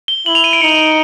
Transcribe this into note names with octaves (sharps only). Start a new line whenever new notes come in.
G7
E4 F#7
F7
D#7
D7
D#4 C#7